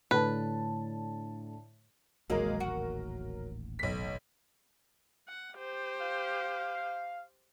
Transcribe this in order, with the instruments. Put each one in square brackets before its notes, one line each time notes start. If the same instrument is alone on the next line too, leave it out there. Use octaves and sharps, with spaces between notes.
[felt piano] A2 D3 A5 [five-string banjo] B4
[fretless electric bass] D#1 A1 D#2 [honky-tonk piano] F#3 A#4 [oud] G#3 A#3
[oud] F#4
[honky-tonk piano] B1 B6
[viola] F#5
G4 C5
[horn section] F5